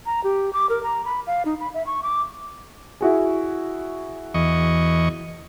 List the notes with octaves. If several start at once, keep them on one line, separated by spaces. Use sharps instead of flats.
A#5
G4
D6
A#4
A#5
B5
F5
D#4
B5
E5
C#6
D6
E4 F#4 G#4
E2 D#5 C#6